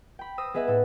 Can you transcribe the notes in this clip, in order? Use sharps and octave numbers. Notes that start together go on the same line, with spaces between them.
G5 B5
C5 D#6 E6 A#6
B3 G#4 B4 D#5 E5 F#5
A2 D#4 A4